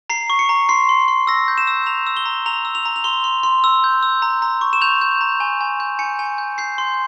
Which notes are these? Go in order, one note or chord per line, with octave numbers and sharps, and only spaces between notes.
A#5 C7
C#6
C#7
A#5
C6 C7
C6
C6
E6 A#6
G6
E7
E6
A#5 F7
E6
G7
A#5
A#5 F7
E6
F7
A#5
F7
C6 G7
C6
C6
E6
G6
E6
A#5
A#5
C#6
E7
G6 F7
G6
A#5
G#5
G#5
G6
G#5 C#7
G#5
G6
G6 C7
C6